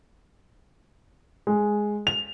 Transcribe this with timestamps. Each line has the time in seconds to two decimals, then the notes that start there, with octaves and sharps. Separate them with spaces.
1.47 G#3
2.07 F7